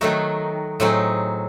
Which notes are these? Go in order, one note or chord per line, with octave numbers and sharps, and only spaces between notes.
D#3 F#3 A3 D#4 F#4
A2 F#3 C4 D#4 G#4